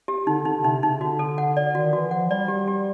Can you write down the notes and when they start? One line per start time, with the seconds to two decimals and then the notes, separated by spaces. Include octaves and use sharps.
0.08 G4
0.27 D3 D#4
0.45 D3 D#4
0.64 C3 D#4
0.82 C#3 D#4
1.01 D3 F#4
1.19 A4
1.38 F#5
1.57 D5
1.75 D#3 F#4
1.93 E3 F#4
2.11 F3 F#5
2.30 G3 D5
2.48 G4
2.68 G4